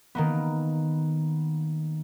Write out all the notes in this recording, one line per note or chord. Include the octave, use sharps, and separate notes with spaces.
D#3 A#3 B3